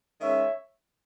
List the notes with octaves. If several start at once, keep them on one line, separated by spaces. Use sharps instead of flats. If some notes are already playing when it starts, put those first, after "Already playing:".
D#3 G#3 C#4 C#5 E5